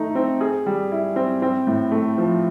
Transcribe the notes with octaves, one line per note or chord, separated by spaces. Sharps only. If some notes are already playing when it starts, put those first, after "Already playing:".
Already playing: A3 D#4
C4
G#4
G3
E4
C4
C4
A2
A3
F3